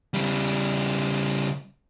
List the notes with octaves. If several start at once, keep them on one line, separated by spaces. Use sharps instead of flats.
C#3 G3